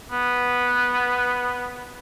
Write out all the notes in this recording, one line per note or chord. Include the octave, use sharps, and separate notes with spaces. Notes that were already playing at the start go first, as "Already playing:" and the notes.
B3